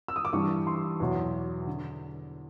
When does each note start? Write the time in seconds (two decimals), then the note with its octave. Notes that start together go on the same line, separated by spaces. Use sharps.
0.08 E6
0.16 D#6
0.25 D6
0.33 G2 E3 G3 C#6
0.67 C6
1.00 E2 B2 F#3
1.67 D3